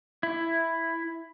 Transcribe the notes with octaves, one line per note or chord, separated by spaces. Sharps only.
E4